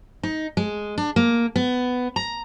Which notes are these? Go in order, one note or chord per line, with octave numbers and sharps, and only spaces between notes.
D#4
G#3
D4
A#3
B3
A#5